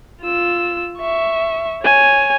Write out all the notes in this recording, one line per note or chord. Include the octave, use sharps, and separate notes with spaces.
F4 E6
E5 C#6
C#5 G#5